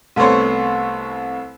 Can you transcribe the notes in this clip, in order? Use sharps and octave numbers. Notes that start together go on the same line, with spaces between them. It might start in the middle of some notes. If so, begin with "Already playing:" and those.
C2 A3 B3 C5 C#5